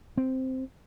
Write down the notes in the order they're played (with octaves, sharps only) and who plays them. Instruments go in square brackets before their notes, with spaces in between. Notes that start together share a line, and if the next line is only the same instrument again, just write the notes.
[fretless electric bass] C4